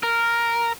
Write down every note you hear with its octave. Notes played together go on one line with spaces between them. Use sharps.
A#4